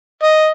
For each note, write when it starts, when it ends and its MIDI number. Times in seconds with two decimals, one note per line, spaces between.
0.23 0.49 75